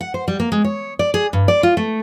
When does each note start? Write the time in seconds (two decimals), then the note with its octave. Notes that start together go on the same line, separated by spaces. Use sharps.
0.01 F#5
0.14 C5
0.28 G3
0.40 A#3
0.52 G#3
0.64 C#5
0.99 D5
1.14 G#4
1.33 G2
1.48 D5
1.63 F4
1.77 A3